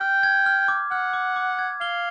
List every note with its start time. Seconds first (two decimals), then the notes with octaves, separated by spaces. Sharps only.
0.01 G5 F6
0.23 G#6
0.46 F6
0.68 D6
0.91 F#5 F6
1.13 D6
1.36 D6
1.59 G#6
1.81 F5 G7